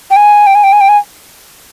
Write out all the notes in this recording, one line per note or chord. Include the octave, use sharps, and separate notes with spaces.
G5
G#5
G5
G#5
G5
G#5
G5
G#5